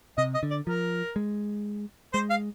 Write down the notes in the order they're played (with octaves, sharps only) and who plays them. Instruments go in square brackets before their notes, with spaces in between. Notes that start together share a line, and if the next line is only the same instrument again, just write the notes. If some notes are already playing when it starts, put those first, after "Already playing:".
[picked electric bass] C3 [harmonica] D#5
[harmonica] D#5
[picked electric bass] D3
[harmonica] D5
[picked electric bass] F3 [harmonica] A#4
[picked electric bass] G#3
[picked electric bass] G#3 [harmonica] C5
[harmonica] F5